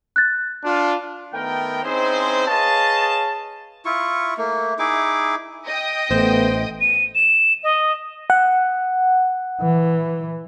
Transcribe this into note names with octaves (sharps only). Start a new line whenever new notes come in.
F#6 A6
D4 F4
D#3 A3 B3 A#4 G5
C4 C#4 D#4 E4 G#4 C5
G#4 B4 C#5 D#5 F5 A5
E4 F4 C#6
A3 A#3
D#4 E4 G#4 D6
D#5 G5 D#6
A1 A3 B3 C5
D#7
E7
D#5
F#5
E3